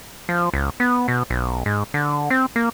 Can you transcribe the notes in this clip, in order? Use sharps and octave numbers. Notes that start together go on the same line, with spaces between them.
F3
C#2
B3
B2
B1
G#2
D3
C4
A#3